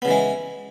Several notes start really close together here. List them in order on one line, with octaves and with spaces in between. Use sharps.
B3 C#3 E3 G#3